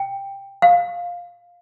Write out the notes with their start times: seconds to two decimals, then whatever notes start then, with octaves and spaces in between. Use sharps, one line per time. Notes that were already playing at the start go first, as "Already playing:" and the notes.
Already playing: G5
0.62 F5